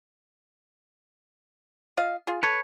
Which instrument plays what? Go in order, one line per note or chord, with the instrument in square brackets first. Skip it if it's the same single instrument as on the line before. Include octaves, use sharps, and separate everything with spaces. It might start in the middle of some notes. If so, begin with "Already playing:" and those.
[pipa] F4 D#5 F5
F4 G#4
[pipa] A4 [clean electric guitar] B4 C#5